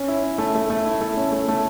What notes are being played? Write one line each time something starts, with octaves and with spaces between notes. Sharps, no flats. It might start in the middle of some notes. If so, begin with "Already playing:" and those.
Already playing: C#4
E4
C#4
A3
A3
A3
E4
A3
C#4
A3
A3